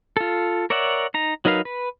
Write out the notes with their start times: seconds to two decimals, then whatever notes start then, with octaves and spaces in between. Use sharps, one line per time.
0.17 F4 A4
0.70 A#4 C#5 D5 E5 F#5
1.14 D#4 A#5
1.45 F#3 D#4 A#4 B4 F5
1.65 B4